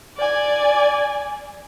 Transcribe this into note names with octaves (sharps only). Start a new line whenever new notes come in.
D5 G#5